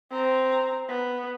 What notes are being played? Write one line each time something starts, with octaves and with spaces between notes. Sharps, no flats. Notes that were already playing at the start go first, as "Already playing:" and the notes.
C4 A#5
B3